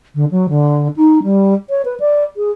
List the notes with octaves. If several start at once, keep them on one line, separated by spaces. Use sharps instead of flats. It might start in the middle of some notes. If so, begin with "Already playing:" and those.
D3
F#3
D3
D#4
G3
C#5
B4
D5
G#4